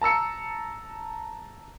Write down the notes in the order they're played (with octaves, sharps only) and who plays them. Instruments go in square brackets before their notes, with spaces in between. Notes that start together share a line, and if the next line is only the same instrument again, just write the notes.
[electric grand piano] A5 A#5 E6 C#7